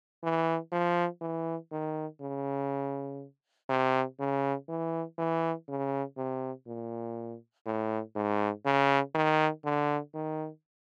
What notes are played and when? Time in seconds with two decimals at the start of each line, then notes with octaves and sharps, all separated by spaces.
0.23 E3
0.72 F3
1.21 E3
1.72 D#3
2.21 C#3
3.69 C3
4.20 C#3
4.69 E3
5.18 E3
5.69 C#3
6.17 C3
6.67 A#2
7.66 A2
8.16 G#2
8.65 C#3
9.15 D#3
9.64 D3
10.14 D#3